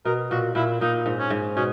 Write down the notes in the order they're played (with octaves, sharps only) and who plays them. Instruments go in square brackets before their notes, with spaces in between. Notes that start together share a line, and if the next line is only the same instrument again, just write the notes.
[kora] B2 [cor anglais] A#4
[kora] A#2 [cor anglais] F#4
[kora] A#2 [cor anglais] E4
[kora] A#2 [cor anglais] D#4
[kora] G#2
[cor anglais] C#4
[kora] G#2
[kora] B2 [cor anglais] C#4